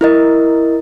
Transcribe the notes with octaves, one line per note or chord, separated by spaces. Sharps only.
E4 A#4 D#5